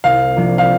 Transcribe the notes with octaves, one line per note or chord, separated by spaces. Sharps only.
C2 F5
C3 F3 A#3 D4
F5